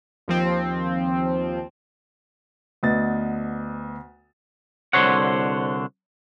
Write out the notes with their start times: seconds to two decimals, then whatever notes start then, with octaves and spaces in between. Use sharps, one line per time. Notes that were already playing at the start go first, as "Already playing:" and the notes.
0.28 D#2 F3 C4
2.83 D2 B3 B4 D#5 A6
4.93 C2 F2 D3 C5 C#5 F#5